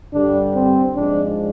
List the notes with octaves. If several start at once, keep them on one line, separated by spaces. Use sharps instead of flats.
G2 D3 G3 D4
C4
G#2 F3 G#3 D4